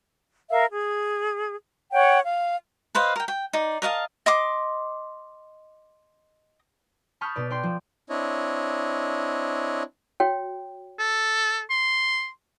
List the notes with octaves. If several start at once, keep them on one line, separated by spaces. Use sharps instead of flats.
A#4 E5 F5
G#4
C#5 F#5 G5
F5
B4 C5 D#5 F5
A#4 G5
G5
D#4 D5
A#4 D#5 F5 A5
D#5 C6 D6
A5 B5 C#6 D#6 F6 G6
B2 B4 D5
D5 G5 C6
F3
C4 D4 E4 C#5 D#5
F#4 C#5 G5
A4
C6